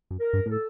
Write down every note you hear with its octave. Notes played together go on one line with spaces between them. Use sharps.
F#2
A#4
G2
A2 A4